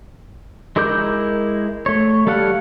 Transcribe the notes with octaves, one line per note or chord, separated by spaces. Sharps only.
G#3 E4 A#4 D6 G6
A3 C#5
G3 A4 F5 F#5